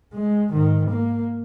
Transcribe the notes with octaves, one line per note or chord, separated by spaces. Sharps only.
G#3
G#2 D#3
A#3